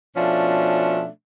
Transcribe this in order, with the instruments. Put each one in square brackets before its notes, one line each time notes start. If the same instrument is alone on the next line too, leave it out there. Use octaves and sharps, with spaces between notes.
[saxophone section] B2 F3 A3 C#4 D4 F4